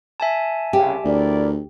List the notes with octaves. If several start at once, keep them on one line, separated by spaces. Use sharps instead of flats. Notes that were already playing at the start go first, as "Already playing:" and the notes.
E5 G#5 A5
C2 C#3 G4
D2 E4 A#4 D5